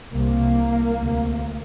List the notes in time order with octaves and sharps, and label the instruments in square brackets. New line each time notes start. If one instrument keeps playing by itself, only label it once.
[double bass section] C2 C3 A#3
D2 C3